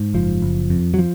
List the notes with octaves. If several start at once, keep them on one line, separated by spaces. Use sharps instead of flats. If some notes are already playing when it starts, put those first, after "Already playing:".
Already playing: G#2
F#1 F3
F#1
F2
F#3
F3